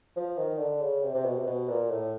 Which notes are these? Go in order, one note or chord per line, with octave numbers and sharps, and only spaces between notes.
F3
D#3
D3
C#3
C3
C3
B2
C3
B2
A#2
A2